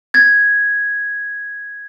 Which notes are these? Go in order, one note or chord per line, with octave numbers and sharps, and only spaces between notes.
G#6 A6